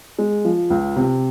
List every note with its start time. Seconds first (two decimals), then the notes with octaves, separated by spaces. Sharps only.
0.19 G#3
0.45 F3
0.70 C#2
0.96 C3